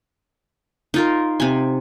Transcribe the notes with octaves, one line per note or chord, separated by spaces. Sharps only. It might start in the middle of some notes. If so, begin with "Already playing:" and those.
D#4 F4 A#4
C3 G#5